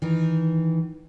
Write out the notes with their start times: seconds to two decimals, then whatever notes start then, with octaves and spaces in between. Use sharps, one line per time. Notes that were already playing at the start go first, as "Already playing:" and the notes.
0.02 D#3 E3